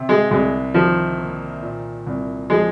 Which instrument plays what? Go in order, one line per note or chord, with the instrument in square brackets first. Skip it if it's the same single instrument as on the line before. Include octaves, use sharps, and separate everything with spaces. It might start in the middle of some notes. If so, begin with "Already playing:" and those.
Already playing: [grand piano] C3
[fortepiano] G#3
[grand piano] C2 [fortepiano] G#3
[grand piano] D#3 [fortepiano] F3
[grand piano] A#3
A#2
C2
[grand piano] F3 [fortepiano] G#3